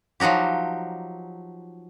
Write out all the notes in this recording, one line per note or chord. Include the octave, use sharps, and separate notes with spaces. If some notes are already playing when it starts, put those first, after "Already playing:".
F3 F#3 D#4 F#4 G4